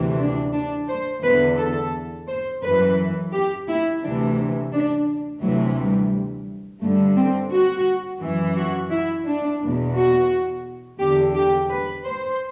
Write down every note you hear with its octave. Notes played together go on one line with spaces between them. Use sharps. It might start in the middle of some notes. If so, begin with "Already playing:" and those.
Already playing: D2 C3 E3
D4
D4
C5
E2 D3 B4
A4
C5
F#2 E3 B4
G4
E4
D2 C3 E3 D4
D4
D2 C3 E3 F#3
G3
G2 D3 A3
C4
F#4
F#2 E3
F#4
E4
D4
E2 B2
F#4
E2 D3 G4
G4
B4
C5